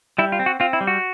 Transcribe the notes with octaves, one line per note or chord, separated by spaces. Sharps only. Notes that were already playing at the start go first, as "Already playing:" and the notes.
G3 E4
F4
C4
F#4
C4 F4
E4
G3
F#4